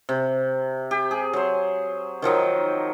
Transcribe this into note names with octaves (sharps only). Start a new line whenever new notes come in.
C3
G4
G#4
F#3 C5
D#3 F3 F#3 D#4